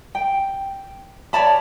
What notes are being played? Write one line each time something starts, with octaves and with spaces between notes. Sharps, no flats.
G5
C#5 D5 A5 B5